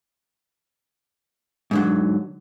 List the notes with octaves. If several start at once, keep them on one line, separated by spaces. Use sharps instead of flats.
G#2 D3 F#3